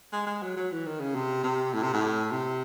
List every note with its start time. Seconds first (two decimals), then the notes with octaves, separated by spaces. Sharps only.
0.13 G#3
0.27 G#3
0.42 F#3
0.57 F#3
0.72 E3
0.86 D#3
1.00 C#3
1.15 C3
1.43 C3
1.73 A2
1.83 C3
1.93 A2
2.31 C3